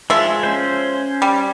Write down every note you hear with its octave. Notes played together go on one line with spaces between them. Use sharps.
F3 G#3 E5
C#4 C5
G3